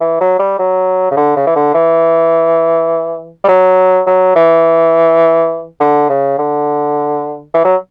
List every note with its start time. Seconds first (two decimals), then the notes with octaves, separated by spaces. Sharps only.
0.01 E3
0.21 F#3
0.39 G3
0.59 F#3
1.11 C#3
1.17 D3
1.36 C#3
1.47 E3
1.56 D3
1.74 E3
3.44 G3
3.48 F#3
4.06 F#3
4.36 E3
5.80 D3
6.09 C#3
6.38 D3
7.54 E3
7.65 F#3